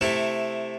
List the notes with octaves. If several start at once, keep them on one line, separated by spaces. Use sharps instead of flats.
C3 A3 E4